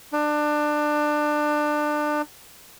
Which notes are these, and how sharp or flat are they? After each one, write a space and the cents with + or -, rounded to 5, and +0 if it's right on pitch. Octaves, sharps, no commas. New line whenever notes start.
D4 +25